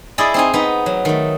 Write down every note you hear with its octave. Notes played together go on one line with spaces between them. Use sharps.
E4 G#4 A4 D5 D#5
C4 D#4 G#5
B3 D#4
F#3
D#3 A3